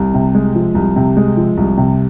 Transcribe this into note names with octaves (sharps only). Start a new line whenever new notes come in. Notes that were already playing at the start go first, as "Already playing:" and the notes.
Already playing: C2
C3
G#3
F3
C2
C3
G#3
F3
C2
C3